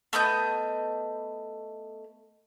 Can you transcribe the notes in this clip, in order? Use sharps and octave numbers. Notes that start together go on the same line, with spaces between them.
A3 B3 D#5 G6